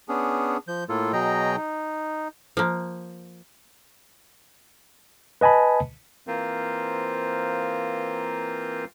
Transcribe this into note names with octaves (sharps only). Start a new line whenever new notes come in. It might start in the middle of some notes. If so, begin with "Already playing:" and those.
B3 C#4 D4 G#4
F3 G6
A2 A#3 F4 A4
B2 F#3 G#4 D#5 G5 A#5
D#4
F3 A#3
B4 D#5 G#5 A5 B5
E3 A#3 C4 F4 A#4 C5